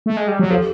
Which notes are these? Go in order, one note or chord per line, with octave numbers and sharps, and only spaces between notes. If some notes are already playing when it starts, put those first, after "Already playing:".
A3
G#3
G3
F#3
F3 G4 A4